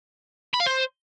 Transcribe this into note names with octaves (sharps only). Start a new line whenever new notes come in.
B5
F5
C5